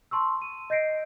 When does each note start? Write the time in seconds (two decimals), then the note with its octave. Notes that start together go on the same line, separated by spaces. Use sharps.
0.11 A5 C6 C#6 E6
0.42 D#7
0.70 D#5 G6 A#6 C7 D7